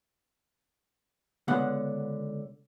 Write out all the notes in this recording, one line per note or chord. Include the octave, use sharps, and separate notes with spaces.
C#2 D3 B3 F#5